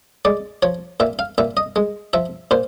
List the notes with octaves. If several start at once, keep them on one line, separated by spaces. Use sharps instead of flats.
G#3 D5
F3 C#5
A#2 E5
F5
A#2 E5
D#5
G#3
F3 E5
A#2 C5